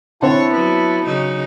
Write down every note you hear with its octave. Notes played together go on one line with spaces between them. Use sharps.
D3 C4 E4 C#5 A5
F#3 B3
C#3 F#3 D#4